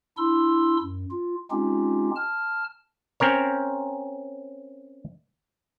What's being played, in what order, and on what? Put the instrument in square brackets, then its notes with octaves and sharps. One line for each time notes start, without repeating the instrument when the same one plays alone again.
[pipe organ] D4 E4 C6 E6
F#2
F4
G#3 C4 C#4 D#4 F4 G4
A5 F6
[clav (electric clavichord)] C4 C#4 A#4 C#5